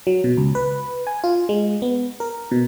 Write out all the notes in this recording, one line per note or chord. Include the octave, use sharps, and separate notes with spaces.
F#3
B2
C#2
B4
G#5
F4
G#3
B3
A#4
B2